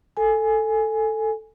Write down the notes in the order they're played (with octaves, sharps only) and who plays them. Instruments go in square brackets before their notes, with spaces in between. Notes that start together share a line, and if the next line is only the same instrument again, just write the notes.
[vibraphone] A4 G#5